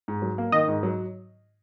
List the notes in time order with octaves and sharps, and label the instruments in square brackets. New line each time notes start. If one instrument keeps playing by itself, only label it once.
[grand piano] G#2
F#3
A#3
[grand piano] D#3 [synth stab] D#5
[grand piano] G#2
F#3